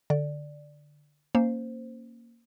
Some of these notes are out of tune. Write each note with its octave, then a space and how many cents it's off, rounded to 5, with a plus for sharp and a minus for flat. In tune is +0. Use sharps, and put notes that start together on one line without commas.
D3 +0 D5 +5
A#3 +0 C#4 +0 C5 -5